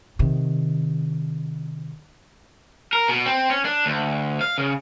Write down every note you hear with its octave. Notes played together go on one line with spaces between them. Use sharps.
C3 D#3
A#4
B2
C4
C#4
D4
D2
F5
C#3